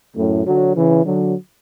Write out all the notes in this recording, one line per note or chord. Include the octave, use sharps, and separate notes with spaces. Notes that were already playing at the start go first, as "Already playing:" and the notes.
F#2 A2
D3 F#3
C#3 E3
D3 F#3